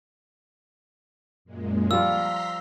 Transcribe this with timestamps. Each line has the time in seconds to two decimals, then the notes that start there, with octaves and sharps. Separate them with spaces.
1.45 F#2 A#2 G#3
1.91 F3 G3 F4 A#5 C6 E6 B6